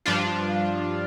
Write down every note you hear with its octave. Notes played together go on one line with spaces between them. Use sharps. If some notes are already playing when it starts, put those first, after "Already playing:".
G2 F3 D4 F4